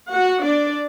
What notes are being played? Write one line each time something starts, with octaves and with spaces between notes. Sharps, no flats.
F#4 F#5
D4 D5